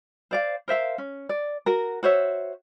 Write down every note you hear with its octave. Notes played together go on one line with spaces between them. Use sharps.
C5 D5 F5
A#4 C5 E5 F5
C#4
D5
F#4 A#4
F#4 C5 C#5 E5